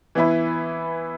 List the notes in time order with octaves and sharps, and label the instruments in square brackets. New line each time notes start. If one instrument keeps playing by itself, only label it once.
[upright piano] E3 B3 E4 B4